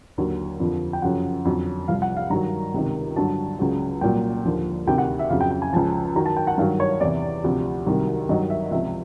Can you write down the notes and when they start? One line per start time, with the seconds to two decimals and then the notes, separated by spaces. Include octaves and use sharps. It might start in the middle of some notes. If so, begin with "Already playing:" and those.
0.18 D#2 D3 F#3
0.60 F2 D3 F3
0.93 G5
1.02 F#2 C#3 F3 F#5
1.45 F2 D3 F#3
1.88 C2 C3 F3 F5
2.02 F#5
2.17 F5
2.30 G2 D#3 F#3 A#5
2.74 C#2 C3 D#3
3.16 G2 D3 F#3 A5
3.59 C#2 C#3 F#3
4.01 C2 A#2 F#3 G5
4.45 D#2 D3 F3
4.87 D2 C3 D#3 G5
4.98 F#5
5.19 E5
5.30 F2 C#3 F#3 F5
5.41 G5
5.51 G5
5.62 G#5
5.73 C#2 C#3 F3 A5
6.15 F#2 D#3 F#3 A#5
6.26 A5
6.37 G5
6.47 F#5
6.58 G2 D#3 F#3 F5
6.80 C#5
7.00 E2 C3 E3 D5
7.44 D2 C3 F3
7.86 C2 C3 D#3 F#3
8.29 G2 D#3 F#3 D#5
8.50 E5
8.71 C#2 C3 F3 E5